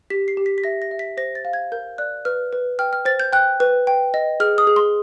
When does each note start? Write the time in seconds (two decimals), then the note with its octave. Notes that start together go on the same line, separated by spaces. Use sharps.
0.10 G4 B6
0.28 C7
0.37 G4
0.46 B6
0.58 B6
0.64 E5 A#6
0.82 A#6
0.91 E5
0.99 B6
1.17 C5 A#6
1.35 A6
1.45 F5
1.53 G#6
1.72 A#4 G6
1.98 D5 F#6
2.25 B4 F6
2.53 B4
2.79 G5 F6
2.93 F6
3.05 C5 A6
3.20 G6
3.33 G5 F#6
3.60 B4
3.87 G5
4.14 D#5
4.40 G#4 F6
4.58 D#6
4.67 G#4
4.76 C6